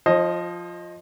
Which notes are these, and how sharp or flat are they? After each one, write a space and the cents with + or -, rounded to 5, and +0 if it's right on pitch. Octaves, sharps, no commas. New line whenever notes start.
F3 +0 C5 +40 D#5 +0